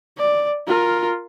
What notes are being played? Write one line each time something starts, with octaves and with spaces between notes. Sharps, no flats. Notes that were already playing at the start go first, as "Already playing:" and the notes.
D5
F4 A#4